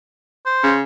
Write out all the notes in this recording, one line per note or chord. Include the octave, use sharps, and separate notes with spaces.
C5
C#3